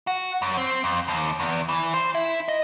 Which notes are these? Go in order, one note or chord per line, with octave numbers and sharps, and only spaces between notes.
F#4
F#2
C4
F2
D#2
E2
E3
C5
E4
D#5